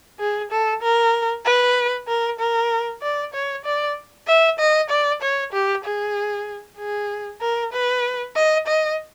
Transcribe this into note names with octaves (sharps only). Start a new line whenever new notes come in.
G#4
A4
A#4
B4
A#4
A#4
D5
C#5
D5
E5
D#5
D5
C#5
G4
G#4
G#4
A#4
B4
D#5
D#5